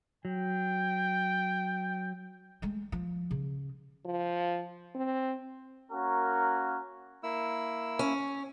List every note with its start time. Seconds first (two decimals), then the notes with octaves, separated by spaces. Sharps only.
0.25 F#3 G5
2.62 G#3 A3
2.92 F3
3.31 C#3
4.05 F3
4.95 C4
5.91 A#3 C#4 F#4 A#4
7.23 A#3 E4 E6
7.99 C#4